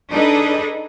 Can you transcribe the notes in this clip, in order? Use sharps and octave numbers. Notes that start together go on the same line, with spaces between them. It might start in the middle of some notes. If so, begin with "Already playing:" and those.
D4 D#4 G#4 A4 B4 D#5